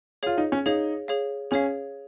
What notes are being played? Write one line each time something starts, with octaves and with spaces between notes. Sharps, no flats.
F4 G#4 C#5 F5
D#4
C#4
D#4 G#4 C#5 F5
G#4 C#5 F5
C#4 G#4 C#5 F5